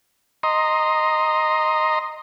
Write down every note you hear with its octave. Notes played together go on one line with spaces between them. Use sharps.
D#5 A#5 C6